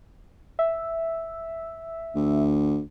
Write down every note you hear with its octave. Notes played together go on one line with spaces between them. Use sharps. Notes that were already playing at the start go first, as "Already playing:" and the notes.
E5
D2